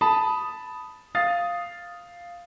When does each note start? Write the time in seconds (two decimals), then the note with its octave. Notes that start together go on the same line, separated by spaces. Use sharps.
0.01 A5 B5 D#6
1.15 F5 D#6 A6